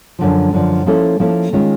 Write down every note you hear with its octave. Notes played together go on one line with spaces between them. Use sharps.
F#2 D3 F3
F#2 D3 F3
F3 A#3 C#4 E4 A4
F3 A#3 C#4 E4 A4
D#3 G#3 C#4 F4